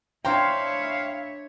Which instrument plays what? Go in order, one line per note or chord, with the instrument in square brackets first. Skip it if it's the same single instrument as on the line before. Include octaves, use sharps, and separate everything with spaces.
[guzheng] D4 C5 A#5 [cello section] E4 C#5 E5 [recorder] F5 [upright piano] G5